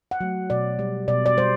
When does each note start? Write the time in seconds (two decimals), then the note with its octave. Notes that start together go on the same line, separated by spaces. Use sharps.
0.11 F#5
0.21 F#3 A3
0.50 B2 D5
0.79 G3
1.08 B2 D5
1.26 D5
1.37 G3 C5